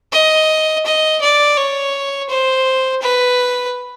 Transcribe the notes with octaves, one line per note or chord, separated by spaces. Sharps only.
D#5
D#5
D5
C#5
C5
B4